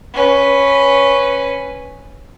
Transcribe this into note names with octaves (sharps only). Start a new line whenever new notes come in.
C#4 B4